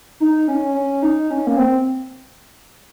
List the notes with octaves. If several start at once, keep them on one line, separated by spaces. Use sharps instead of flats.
D#4
C#4
C#4
D#4
C#4
A#3
C4